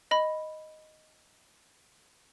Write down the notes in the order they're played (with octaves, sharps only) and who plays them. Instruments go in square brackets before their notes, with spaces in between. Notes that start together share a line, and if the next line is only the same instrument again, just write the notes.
[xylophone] D#5 B5